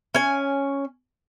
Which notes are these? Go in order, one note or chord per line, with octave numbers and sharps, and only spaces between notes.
C#4 G#5